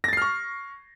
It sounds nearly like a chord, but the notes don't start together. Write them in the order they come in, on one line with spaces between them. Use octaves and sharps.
A#6 A6 C7 F6 C#6